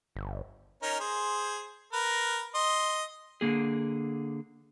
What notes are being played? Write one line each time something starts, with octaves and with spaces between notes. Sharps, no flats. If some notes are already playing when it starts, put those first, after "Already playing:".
G1
C#4 D#4 A#4
G#4 C5
A#4 B4
D#5 C6
D3 A#3 G#4